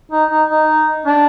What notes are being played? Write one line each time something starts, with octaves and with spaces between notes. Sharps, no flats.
D#4
D#4
D#4
D4